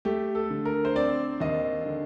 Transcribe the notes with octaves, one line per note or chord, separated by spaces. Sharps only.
A3 G4
A4
D3
A#4
C5
C4 D5
D#2 D#5
D3